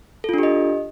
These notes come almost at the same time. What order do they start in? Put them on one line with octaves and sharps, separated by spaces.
A4 F4 D4 G4 D#5